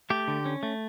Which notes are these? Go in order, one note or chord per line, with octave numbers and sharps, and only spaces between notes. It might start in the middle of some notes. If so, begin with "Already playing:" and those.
A3 G4
D3
C#4
A3